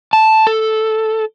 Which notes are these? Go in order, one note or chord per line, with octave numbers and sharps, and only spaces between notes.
A5
A4